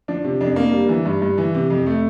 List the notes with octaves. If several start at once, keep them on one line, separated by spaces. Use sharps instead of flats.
F3 D4
C3
F2 D4
A#3
G3
E3
G2
G2
E3
C3
F2
A3